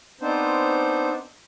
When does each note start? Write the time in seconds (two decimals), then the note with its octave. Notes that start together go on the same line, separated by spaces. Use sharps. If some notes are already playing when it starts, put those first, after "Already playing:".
0.21 B3 C4 D4 D#4 C5